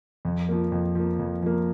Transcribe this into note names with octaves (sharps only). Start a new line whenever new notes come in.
F2
F3 A#3
F2
F3 A#3
F2
F3 A#3